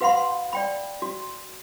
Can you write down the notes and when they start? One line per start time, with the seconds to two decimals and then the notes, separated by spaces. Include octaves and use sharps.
0.01 F#4 B4 F5 F#5 B5 C6
0.53 D5 G5 B5
1.02 F#4